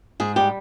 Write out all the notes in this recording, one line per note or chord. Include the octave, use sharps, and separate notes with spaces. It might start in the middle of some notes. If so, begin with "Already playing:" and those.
G#2 G#4
G3 G4